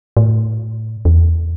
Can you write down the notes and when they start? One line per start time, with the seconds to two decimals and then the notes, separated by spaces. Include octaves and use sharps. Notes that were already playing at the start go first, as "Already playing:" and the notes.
0.17 A2
1.05 E2